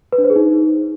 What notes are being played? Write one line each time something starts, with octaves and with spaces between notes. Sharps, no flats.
B4
D4
C5
G#4
D#4